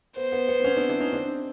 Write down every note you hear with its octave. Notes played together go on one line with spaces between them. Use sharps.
B3 C5
B3
B3
C4
B3 C#4
C4 D4
D4 E4
C#4 D#4
C4 D4